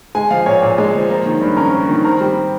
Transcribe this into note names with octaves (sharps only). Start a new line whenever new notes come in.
G#3 G#5
F3 F5
A#2 C#5
A#2
G#3
F3
A#3
D#3
G2
C#4 A#4
A#3
D#3
C4 A#4
G3